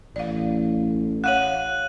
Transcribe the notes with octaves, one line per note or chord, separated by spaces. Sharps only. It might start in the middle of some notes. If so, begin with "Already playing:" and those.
A1 D5 F5
C#5 F5 F#5 F#6 D#7 F#7